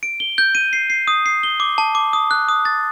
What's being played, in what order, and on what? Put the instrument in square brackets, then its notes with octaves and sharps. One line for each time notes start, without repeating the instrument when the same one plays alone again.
[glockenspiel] D7
G7
G6
D#7
C7
C7
D#6
C7
G7
D6
A5
D6
D#6
F#6
D#6
A6